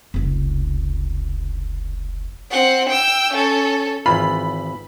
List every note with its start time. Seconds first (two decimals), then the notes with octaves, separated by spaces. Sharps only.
0.14 F1 C#2
2.51 C4 F#5
2.89 G5 E6
3.33 C#4 A4
4.06 G#1 E3 F4 B5